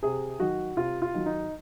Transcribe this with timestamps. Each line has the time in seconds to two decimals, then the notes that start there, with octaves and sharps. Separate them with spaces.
0.03 C3 G#4
0.40 D#3 F#3 F#4
0.77 C3 F4
1.02 F4
1.14 D#3 F#3
1.26 D#4